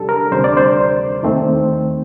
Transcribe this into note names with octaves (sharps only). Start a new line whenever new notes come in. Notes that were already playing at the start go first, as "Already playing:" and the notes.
Already playing: C3 G3 D4 G4 A4
A#4
D2 C3 G3 D4 C5
D5
C5
D#2 D#3 A3 C4